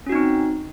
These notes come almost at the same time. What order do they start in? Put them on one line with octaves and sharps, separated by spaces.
C#4 F#4 D#4 C4